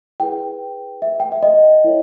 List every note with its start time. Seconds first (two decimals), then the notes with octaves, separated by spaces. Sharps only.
0.20 E4 G#4 B4 G5
1.02 E5
1.20 G5
1.32 E5
1.43 D#5
1.85 E4 A#4 C#5